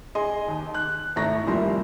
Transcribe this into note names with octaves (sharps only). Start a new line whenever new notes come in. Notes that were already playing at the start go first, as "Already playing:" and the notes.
G#4 D#5 C6
D#2
F#6
G#1 A3 E4 A#5 C#6 A#6
F1 F3 G3 A#3 E4 C6